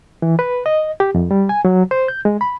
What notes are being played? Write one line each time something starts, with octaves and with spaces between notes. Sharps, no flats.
E3
B4
D#5
G4
F2
G3
G#5
F#3
C5
G6
G#3
B5